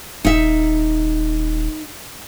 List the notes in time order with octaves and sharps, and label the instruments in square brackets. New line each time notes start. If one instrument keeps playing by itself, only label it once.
[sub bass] D#1 [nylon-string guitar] D#4 E5